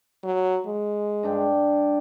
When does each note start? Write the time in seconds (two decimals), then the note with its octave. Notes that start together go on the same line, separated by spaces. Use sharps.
0.24 F#3
0.67 G#3
1.23 G2 D4 G5